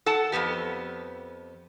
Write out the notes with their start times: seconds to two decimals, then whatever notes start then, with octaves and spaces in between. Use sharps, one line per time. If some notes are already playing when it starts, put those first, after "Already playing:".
0.06 A4 F#5 A5
0.32 F2 B2 B3 G4